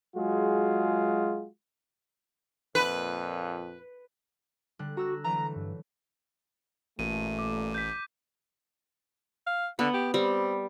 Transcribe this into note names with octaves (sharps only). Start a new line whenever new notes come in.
F#3 G#3 F4 F#4 G#4
F2 A#2 B4
D3 G3 F#6
F#4 A#5 E6 F#6
E3 F#3 A3 A#5
G2
A1 A#2 A3 D#7
D6
G6 B6
F5
D3 B3
G4
G3 C4